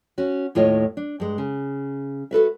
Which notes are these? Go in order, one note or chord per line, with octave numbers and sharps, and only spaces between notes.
C#4 F#4
D#2 A2 F4 C#5 D#5
D4
G2 G#3
C#3
F#4 A4 B4 E5